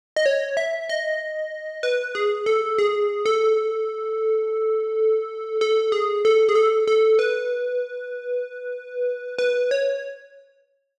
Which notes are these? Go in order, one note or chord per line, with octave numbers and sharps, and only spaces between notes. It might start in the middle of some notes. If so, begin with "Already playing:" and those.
D#5
C#5
E5
D#5
B4
G#4
A4
G#4
A4
A4
G#4
A4
G#4
A4
A4
B4
B4
C#5